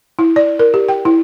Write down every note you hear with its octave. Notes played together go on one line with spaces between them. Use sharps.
E4
D5
A#4
G4
G5
E4